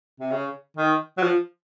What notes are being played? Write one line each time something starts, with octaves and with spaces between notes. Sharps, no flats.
C3
C#3
D#3
F#3
F3